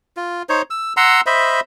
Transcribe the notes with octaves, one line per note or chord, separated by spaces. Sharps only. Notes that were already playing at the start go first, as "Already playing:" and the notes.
F4
D#4 C5 C#5
E6
F#5 A#5 C6 E6
C5 D#5 E5 B5